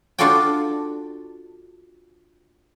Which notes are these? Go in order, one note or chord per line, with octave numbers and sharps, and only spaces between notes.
D4 F4 F#4 A4 D5 G5